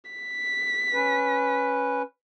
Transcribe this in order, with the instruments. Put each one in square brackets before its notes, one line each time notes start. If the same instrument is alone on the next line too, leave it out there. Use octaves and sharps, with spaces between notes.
[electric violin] B6
[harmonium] C#4 B4